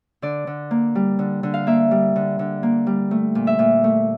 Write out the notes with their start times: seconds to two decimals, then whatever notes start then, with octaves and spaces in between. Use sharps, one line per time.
0.22 D3 D5
0.47 D3
0.71 A#3
0.95 G3
1.19 D3
1.43 D3
1.54 F5
1.67 A#3 E5
1.91 G3
2.16 D3
2.39 D3
2.63 A#3
2.87 G3
3.11 A3
3.35 A#2
3.47 E5
3.59 A#2
3.84 A3